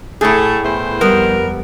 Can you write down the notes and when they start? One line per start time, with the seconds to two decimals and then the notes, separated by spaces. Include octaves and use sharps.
0.21 A2 A3 G#4
0.63 E2 E3 C5
1.01 F2 G3 B3 A#4